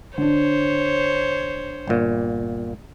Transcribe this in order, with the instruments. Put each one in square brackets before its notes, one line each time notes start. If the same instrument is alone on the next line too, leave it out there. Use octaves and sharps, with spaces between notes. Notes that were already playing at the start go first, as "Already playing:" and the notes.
[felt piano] D3 D4 [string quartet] C5 C#5
[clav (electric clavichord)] G1 A#2